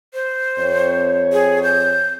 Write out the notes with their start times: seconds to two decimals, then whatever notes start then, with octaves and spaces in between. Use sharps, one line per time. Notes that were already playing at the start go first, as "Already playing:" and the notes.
0.14 C5
0.58 F2 C4 C#5
1.32 G#4
1.63 G6